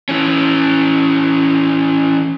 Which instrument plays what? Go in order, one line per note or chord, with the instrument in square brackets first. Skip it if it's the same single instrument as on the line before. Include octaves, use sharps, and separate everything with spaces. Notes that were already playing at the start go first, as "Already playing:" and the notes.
[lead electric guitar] E3 C#4